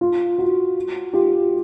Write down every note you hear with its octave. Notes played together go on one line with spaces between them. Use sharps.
F4
F#4
F4 G4